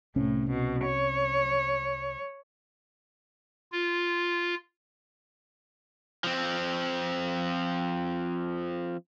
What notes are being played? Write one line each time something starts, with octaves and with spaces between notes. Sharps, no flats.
C2 A2 C3 C#4
B2
C#5
F4
F3 C4